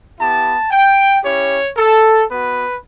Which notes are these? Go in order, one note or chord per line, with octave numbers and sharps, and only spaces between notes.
B3 E4 G4 A5
G5
C#4 E4 G4 C#5
A4
B3 F#4 B4